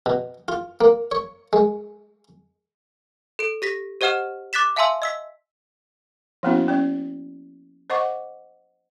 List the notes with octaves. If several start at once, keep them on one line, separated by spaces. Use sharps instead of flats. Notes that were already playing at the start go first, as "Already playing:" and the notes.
B2
F4
A#3
C#5
G#3
A4 D7
G4 A#6 B6
G4 C5 D#5 F#5 F6 E7
D6 F#6 A6 B6 E7
E5 F5 G#5 A5 C6 E6
D#5 E6 B6
F3 A#3 B3 C#4 E4 F#4
C#4 D5
C5 D#5 F#5 C#6 D6